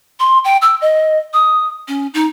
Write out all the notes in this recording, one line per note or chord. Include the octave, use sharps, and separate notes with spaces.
C6
G5
E6
D#5
D#6
C#4
D#4